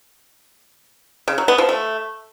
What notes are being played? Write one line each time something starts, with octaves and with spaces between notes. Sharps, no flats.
C#3
F#3
B3
F3
A3